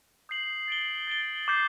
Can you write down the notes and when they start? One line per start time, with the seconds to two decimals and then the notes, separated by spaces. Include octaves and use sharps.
0.29 D#6 G6 C7 F#7
0.68 A6 D7 G7
1.07 A6 D7 G7
1.48 D6 G6 C7